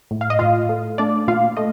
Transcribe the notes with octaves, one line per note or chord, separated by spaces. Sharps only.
A2
F5
D#5
A2 F4 F5
A3
A3 D4 D5
A#2 F4 F5
A3 D#5